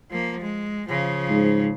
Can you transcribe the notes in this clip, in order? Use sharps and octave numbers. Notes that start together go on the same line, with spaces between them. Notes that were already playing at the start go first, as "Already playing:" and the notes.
F3 A#3
G#3
C#3 F3
G#2